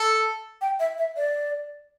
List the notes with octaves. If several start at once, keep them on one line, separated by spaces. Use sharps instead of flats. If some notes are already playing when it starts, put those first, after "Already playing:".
Already playing: A4
G5
E5
E5
D5